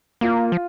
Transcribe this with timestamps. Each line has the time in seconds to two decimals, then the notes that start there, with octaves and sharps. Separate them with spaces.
0.21 A#3 F4
0.52 F3